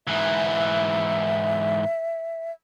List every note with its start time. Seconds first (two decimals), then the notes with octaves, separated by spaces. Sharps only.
0.07 G#2 E3 E5